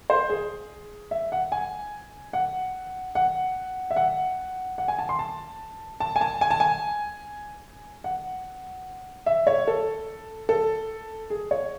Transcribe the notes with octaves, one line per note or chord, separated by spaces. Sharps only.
C5
G#4
E5
F#5
G#5
F#5
F#5
E5
F#5
F#5
G#5
A5
C6
A5
A5
G#5
A5
G#5
A5
G#5
F#5
E5
C#5
A4
A4
G#4
C#5